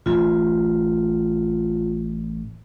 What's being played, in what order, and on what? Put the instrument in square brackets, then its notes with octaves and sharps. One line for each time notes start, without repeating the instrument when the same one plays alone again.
[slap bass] A1 [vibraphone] F4